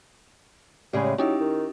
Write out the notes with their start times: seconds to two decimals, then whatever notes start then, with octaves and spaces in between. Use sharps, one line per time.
0.93 A2 C#3 G3 G#3
1.18 F#3 C#4 D#4 E4 G4
1.40 D#3